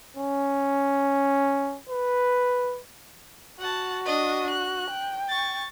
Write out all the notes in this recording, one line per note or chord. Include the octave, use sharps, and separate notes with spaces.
C#4
B4
F#4 F#5 A5
D4 D#5
F#6
G5
C#6 A6